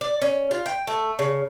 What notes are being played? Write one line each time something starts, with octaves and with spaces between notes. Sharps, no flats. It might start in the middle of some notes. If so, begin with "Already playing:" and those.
D5
C#4
F4
G5
A3
C#3